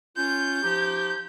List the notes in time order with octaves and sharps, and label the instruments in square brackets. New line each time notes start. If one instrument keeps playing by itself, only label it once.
[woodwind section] C#4 F4 [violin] G6
[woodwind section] F3 D#4 G4